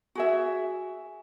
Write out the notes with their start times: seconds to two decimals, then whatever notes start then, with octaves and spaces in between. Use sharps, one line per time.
0.15 F#4 G#4 E5